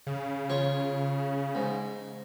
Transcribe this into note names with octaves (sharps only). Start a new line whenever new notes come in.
C#3
F4 C#5
G#2